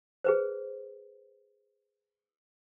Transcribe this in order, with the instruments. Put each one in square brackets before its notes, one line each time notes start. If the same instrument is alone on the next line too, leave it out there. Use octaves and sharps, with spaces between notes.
[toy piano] G#4 B4 C5